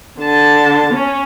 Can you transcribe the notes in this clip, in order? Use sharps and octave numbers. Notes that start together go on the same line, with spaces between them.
D3 A5
C#4